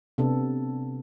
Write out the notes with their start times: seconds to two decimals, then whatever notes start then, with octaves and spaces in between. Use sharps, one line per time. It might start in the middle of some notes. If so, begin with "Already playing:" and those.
0.18 C3 B3 D4 A4